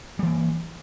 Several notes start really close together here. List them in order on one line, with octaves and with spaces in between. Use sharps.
G3 E3 A#3